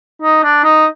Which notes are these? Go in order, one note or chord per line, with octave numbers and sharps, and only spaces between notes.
D#4
D4
D#4